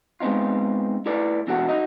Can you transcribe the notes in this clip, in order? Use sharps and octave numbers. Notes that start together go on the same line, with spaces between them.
G#3 B3 C4 D#4 F4
A2 E4 A4 B4 D5
B2 E3 D4 F#4 A4 F#5
D#4 F#4 D#5